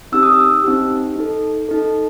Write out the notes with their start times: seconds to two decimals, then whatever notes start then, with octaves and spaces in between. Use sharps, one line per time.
0.12 C4 D#4 G4 E6
0.23 D#6
0.32 E6
0.64 C4 D#4 G4
1.16 D#4 A4
1.69 D#4 A4